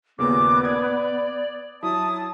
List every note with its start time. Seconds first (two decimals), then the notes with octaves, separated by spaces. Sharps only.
0.19 D#2 A#2 C#3 B3 D6
0.65 D5 D6 D#6 G#6
1.83 F#3 E4 A5 D#6